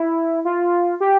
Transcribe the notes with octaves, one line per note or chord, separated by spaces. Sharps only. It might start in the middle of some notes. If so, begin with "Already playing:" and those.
Already playing: E4
F4
G4